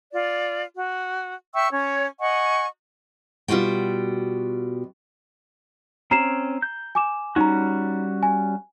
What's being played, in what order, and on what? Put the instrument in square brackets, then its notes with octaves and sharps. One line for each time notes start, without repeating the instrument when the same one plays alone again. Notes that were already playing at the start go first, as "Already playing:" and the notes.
[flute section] F4 D5
F#4
E5 G5 C#6 E6
C#4 C#5
D#5 F#5 G#5 C#6
[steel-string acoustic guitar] B2 G3 F4 F#4 G5
[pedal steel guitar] C4 C#4 [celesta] A#5 C7 E7
[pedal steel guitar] G6
[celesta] G#5 D6 E7
[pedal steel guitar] G3 C#4 F#4 [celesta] D#4 A#5
[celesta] G#5